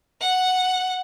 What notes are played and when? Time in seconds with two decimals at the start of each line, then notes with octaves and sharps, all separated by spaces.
0.21 F#5